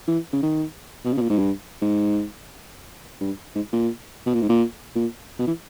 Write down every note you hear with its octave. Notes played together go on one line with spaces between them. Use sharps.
E3
C#3
D#3
B2
C#3
B2
A#2
G#2
G2
G#2
G2
G#2
A#2
B2
A#2
G#2
A#2
A#2
B2
E3